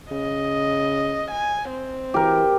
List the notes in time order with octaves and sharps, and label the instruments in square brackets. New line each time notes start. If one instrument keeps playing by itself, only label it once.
[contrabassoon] C#3 [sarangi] D#5
[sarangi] G#5
C4
[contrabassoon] E3 [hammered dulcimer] G4 A#4